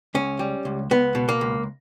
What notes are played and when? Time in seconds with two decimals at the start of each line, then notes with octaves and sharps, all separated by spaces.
0.15 C#2 C#4
0.39 G3
0.65 C#2
0.91 C#2 B3
1.15 B2
1.29 A#3
1.41 C#2